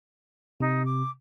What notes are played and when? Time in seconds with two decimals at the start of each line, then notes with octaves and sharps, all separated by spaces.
0.60 C3 D#4
0.85 D6